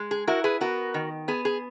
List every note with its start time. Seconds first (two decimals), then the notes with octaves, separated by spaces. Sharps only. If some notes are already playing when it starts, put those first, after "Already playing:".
Already playing: G#3
0.11 G#4
0.27 E4 F#4 A#4
0.44 G#4 B4
0.61 B3 F#4 A#4
0.94 D#3
1.28 B3 G#4
1.45 G#4